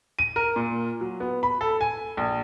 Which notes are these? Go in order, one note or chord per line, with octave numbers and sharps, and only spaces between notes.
D#7
A#4
A#2
F#3
B3
B5
A4
G#5
A#1